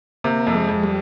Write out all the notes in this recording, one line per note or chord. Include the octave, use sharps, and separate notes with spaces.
C3 A#3
F2
G#3
F2
G3